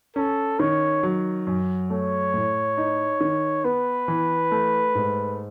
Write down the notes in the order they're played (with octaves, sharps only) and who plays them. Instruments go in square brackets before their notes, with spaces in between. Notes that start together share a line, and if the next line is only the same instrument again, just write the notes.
[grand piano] C#4 [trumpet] A4
[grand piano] D#3 [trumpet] C#5
[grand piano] F#3
F#2
[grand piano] A3 [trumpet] C#5
[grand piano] A2
D#4
D#3
[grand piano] B3 [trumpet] B4
[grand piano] E3
A3
G#2